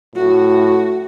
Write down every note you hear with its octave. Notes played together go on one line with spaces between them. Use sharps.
A2 F#4